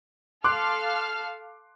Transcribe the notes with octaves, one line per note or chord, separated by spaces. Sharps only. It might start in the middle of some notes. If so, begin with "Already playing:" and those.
A4 F5 C6 D6 F6 F#6